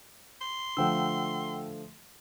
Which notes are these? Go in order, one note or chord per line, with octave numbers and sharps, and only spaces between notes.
C6
D3 F3 A3 F#5 G5 E6